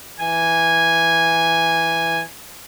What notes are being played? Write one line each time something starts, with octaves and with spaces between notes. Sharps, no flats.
E3 G#5